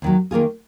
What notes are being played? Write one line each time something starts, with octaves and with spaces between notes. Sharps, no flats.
D#2 D#3 F#3
D#3 A#3 F4 G#4